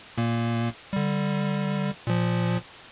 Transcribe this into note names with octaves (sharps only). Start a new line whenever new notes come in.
A#2 A#3
D3 G3
A#2 F3